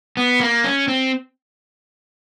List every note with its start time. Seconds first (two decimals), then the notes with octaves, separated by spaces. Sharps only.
0.17 B3
0.41 A#3
0.64 C#4
0.88 C4